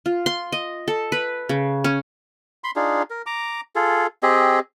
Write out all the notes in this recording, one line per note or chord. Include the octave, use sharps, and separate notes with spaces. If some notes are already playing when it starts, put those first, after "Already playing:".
F4
C6
D#5
A4
B4
C#3
C#4
B5 C6
D4 D#4 F4 G#4
A#4
A#5 D6
F4 G#4 A4
C4 G4 G#4 D#5